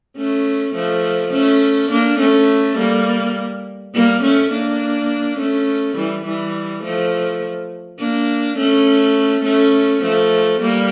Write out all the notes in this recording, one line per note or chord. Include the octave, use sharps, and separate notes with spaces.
A3 C#4
F3 A3
A3 C#4
A#3 D4
A3 C#4
G3 A#3
G3 A#3
A3 C#4
A#3 D4
A3 C#4
E3 G3
E3 G3
F3 A3
A#3 D4
A3 C#4
A3 C#4
F3 A3
G3 A#3